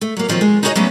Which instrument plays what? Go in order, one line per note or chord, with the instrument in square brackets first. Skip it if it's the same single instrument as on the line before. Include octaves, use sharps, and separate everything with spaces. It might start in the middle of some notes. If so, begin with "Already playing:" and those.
[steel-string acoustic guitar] A3
F#3 A#3
D#3 F3 F#3 C4
G#3
D#4 E4 F#4 G#4 C#5 D#5
F#3 G3 A3 B3 C#4